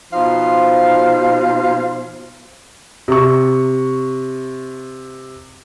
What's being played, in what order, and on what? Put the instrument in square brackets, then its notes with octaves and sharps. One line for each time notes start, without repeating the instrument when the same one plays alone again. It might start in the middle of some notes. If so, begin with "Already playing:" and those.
[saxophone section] B2 F3 D#4 C5 F5
[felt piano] C3 C#6